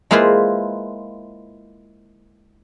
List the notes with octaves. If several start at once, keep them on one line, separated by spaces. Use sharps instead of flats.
G#3 A#3 E4 F4 B4 C5